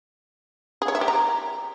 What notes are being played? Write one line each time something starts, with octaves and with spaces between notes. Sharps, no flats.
G#4
C#5
E5
G4
A#5